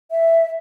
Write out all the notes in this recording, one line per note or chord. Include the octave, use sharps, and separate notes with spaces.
E5